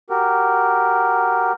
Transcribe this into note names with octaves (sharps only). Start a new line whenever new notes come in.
F#4 G4 A#4